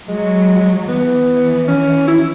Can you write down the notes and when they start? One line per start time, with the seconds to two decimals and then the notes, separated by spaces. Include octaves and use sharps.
0.09 F#3 G#3
0.88 E3 B3
1.28 E3
1.68 C#4
2.08 E4